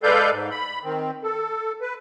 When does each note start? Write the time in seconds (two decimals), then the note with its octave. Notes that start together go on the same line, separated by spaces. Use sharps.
0.03 G#3 A4 B4 D5 F5 G6
0.31 G#2
0.51 B5
0.84 D#3 C4
1.24 A4
1.82 B4